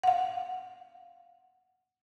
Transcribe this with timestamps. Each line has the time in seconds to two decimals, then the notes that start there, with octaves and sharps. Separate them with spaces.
0.03 F5 F#5